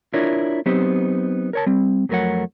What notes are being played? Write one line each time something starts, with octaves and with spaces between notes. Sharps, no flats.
D4 E4 F4 A#4 C#5 D5
F#3 B3 C4 D#4 G4 C5
A#4 C#5 A5
G3 C4
F2 F#3 A3 A#4 C#5 F#5